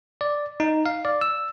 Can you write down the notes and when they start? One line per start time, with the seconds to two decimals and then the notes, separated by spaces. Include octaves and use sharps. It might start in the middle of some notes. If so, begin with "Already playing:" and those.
0.21 D5
0.60 D#4
0.86 F5
1.05 D5
1.21 E6